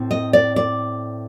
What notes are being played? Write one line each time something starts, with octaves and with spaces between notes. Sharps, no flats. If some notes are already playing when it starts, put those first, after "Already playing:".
Already playing: A2 A3 C4
D#5
D5
D5